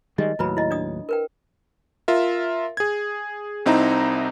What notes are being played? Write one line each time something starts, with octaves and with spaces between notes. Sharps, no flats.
D#3 G3 G#3 D#5
D#2 A2 F#3 E4 B4 B5
E4 D#5
D4 D5 D#6
A#4 B4 G5
F4 A#4 E5
G#4 G#6
C2 C4 D#4 E4 A#5